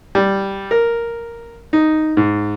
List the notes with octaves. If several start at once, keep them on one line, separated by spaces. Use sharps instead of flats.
G3
A#4
D#4
G#2